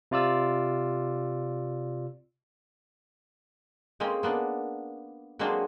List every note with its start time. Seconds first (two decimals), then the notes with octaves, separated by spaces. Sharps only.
0.11 C3 F4 D5 E6
4.00 G#3 A#3 C4 C#4
4.23 A#3 B3 D4
5.39 F#3 G#3 A#3 C4 D4 G#4